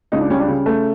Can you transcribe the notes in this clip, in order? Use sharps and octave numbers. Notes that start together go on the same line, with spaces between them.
C#2 D#4
D4
G3 C#4
D4
C#3
A3